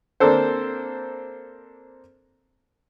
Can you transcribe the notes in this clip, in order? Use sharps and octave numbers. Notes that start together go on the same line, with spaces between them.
A#3 C4 D4 A4 C5